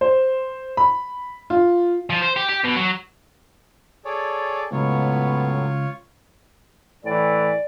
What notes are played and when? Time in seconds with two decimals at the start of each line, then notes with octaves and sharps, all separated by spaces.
0.01 C5
0.77 B5
1.50 F4
2.10 F3
2.22 C5
2.36 G4
2.49 G4
2.64 B2
2.76 F#3
4.05 G#4 A4 C#5 D5
4.72 C#2 A2 F#3 B3 F4 C#5
7.05 A2 E3 D5